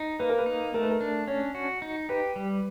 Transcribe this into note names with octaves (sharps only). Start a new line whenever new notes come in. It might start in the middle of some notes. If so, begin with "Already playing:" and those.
Already playing: D#4
A#3 B4
A#4
B4
D#4
A3 A#4
B4
A#4
D4
C#4 C#5
F#4
D#4
G4 B4
G3